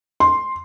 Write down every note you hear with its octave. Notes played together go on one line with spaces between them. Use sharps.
C6